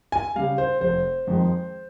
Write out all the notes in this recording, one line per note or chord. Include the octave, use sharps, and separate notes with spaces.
G#5
C#3 G3 F5
C5
F1 C5
F2 D#3 G#3